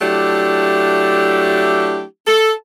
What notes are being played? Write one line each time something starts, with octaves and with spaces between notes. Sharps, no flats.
F#3 A3 D4 E4 G4
A4